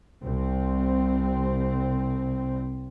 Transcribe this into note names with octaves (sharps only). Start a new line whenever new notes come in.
C2 C4